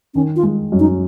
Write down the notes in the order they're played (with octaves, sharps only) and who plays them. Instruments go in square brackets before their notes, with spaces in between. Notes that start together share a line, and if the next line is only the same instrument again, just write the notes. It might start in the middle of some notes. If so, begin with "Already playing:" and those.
[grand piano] D#3 [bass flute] C#4
[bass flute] F4
[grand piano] G#3
F#2
[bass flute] D#4